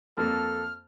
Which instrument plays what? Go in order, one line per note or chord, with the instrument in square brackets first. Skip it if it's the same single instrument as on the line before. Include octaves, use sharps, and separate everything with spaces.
[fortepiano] F2 A#3 [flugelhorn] A4 [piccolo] F6